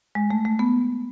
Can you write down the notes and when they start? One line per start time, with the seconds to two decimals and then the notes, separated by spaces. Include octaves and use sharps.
0.15 G#3
0.31 A3
0.45 A3
0.59 B3